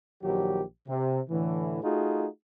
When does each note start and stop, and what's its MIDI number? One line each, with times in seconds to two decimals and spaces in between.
0.23 0.62 34
0.23 0.62 51
0.23 0.62 54
0.23 0.62 67
0.88 1.18 48
1.30 1.82 45
1.30 1.82 50
1.30 1.82 52
1.83 2.27 57
1.83 2.27 63
1.83 2.27 65
1.83 2.27 66
1.83 2.27 68